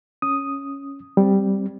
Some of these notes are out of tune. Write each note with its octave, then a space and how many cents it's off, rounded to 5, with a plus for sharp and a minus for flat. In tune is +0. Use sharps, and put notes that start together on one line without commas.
C#4 +0 D#6 +0
G3 +0 C4 +0